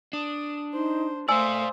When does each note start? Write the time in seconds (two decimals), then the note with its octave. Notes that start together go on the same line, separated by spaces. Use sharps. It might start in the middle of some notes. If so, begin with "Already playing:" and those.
0.13 D4 D#6
0.73 D#4 C5
1.29 A3 C5 D5 F5 G#5 D#6 E6